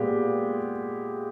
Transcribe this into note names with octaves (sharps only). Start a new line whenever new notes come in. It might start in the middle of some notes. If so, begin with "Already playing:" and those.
Already playing: A#2 G#3 B3 G4